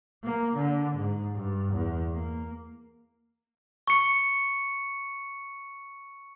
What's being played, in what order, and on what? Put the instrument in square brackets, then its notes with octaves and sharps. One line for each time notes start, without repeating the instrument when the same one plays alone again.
[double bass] A#3
D3
G#2
G2
E2
A#3
[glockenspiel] C#6 C#7